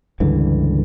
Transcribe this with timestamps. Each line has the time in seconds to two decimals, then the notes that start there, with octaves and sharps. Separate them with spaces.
0.20 C#2 G2 D3 E3